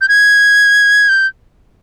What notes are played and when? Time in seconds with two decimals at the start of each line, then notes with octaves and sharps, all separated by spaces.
0.01 G6
0.09 G#6
1.09 G6